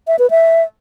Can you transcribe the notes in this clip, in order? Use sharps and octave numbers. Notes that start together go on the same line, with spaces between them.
E5
B4
E5